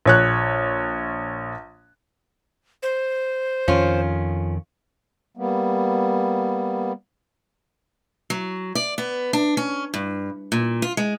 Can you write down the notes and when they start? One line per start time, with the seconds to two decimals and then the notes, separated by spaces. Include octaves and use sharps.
0.05 A#1 C#5 F#6
2.83 C5
3.68 F2 D#3 C#4 F4
5.37 G3 A#3 B3
8.30 F#3
8.75 D5
8.98 B3
9.33 D4
9.57 C#4
9.94 G2
10.52 A#2
10.82 F4
10.97 G#3